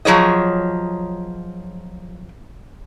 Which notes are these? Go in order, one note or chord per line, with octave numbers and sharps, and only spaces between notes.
F3 F#3 G#4 C#5 D#5